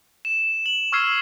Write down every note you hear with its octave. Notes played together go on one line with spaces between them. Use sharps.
E7
F#7
C#6 E6 F6 G#6 C7